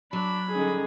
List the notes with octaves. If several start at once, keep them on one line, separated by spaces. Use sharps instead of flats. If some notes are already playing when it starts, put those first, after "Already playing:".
F#3 D4 B5
D3 G3 C#4 D#4 G#4